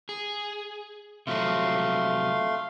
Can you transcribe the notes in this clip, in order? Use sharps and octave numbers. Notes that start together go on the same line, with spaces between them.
G#4
C3 F3 F#3 A3 F5 C6